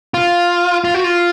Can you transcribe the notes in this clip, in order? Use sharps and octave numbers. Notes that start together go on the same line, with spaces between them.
F4
F4
F#4
F4